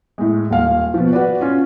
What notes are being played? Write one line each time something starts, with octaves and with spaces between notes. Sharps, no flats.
A2 G#3
D#1 F5
B2 F3
F#4 B4 D5
C#4 F4